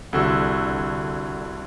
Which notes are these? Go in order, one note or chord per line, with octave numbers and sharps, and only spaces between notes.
C2 D3 F#4 E6